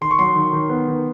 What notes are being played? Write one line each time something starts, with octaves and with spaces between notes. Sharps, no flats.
D#3 C6
C#6
F#3 C6
D#3
D#3
B3
D#3